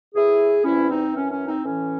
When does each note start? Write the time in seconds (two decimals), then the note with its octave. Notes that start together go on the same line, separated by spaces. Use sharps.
0.14 A2 E3 E4 G#4
0.64 E2 C3 E3 C#4 E4
0.89 C4 D#4
1.13 F#2 E3 C#4
1.30 C#4
1.46 C4 D#4
1.63 A2 E3 C#4